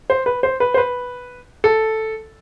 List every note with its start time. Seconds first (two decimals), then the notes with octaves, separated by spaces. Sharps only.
0.10 C5
0.26 B4
0.43 C5
0.60 B4
0.74 C5
0.77 B4
1.64 A4